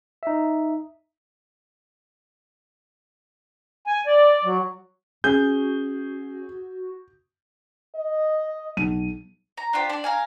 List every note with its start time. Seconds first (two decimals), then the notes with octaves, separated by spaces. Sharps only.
0.23 D#4 E5
3.87 G#5
4.07 D5
4.44 F#3
5.24 C#4 F#4 G#4 G6
7.95 D#5
8.77 B1 D#7
9.57 A#5
9.73 D4 F4 G4 C5
9.89 D4 D5
10.04 A#4 F5 G#5